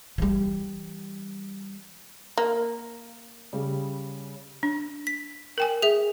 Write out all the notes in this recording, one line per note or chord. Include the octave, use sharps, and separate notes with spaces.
E3 G3
A#3
C#3 G3
D4
B6
A#4 G5 G#5
G#4 E5